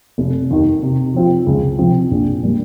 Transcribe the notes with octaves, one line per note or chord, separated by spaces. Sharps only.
F1
D#2 D#3
C3
F3 C4 F4
C#2
C3 F3 C4
A#1
A#2 G3